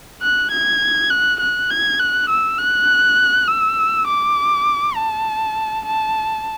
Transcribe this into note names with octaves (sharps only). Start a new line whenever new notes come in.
F#6
G#6
F#6
F#6
G#6
F#6
E6
F#6
E6
D6
A5
A5